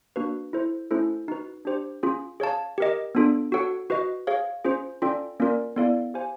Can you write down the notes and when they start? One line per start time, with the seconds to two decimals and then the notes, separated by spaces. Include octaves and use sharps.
0.16 A#3 D4 F#4 B4
0.53 E4 A4 C5
0.91 A3 C#4 E4 A4 C5
1.28 D#4 F#4 B4
1.65 D4 G4 C5
2.03 C#4 F4 G#4
2.40 G#4 C#5 F5 A5
2.78 G4 A#4 D#5
3.15 B3 D4 F4 A4
3.52 F#4 A4 C#5 F#5
3.90 F#4 B4 D#5
4.27 G#4 C#5 F5
4.65 C#4 F4 G#4 C5
5.02 C#4 F4 A4 D5 G5
5.40 A#3 C#4 F4 A#4 D5
5.76 B3 E4 A4 D5 F5
6.14 G4 C5 F5 G#5